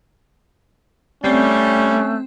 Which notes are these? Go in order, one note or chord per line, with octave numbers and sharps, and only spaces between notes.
G3 A3 C4 C#4